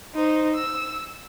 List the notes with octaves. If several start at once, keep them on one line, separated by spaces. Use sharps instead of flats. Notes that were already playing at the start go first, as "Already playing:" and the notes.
D#4 C5
E6